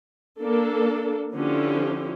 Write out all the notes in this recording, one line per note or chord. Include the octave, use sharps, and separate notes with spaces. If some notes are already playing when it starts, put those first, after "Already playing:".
A#3 D4 A4
D3 F3 C#4 E4 G4